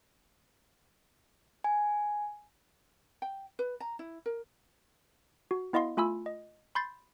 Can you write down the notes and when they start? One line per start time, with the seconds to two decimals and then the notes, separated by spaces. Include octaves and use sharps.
1.64 G#5
3.22 G5
3.59 B4
3.80 A#5
3.99 E4
4.26 A#4
5.51 F#4
5.73 B3 E4 D#5 F5 C6
5.97 A3 F4 G#5 B5 E6
6.26 D#5
6.75 B5 C6 G6 A6 C7